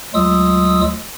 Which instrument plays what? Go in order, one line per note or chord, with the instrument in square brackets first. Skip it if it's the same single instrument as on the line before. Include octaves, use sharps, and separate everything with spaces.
[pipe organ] D2 F#3 G#3 F4 D#6 E6